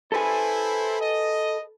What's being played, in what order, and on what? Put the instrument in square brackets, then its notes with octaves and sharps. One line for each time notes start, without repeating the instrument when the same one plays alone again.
[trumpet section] E4 C5 [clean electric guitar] A4 B4 G#5
[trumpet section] D#5